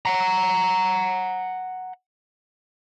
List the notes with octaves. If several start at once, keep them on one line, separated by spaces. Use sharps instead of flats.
F#5 A#5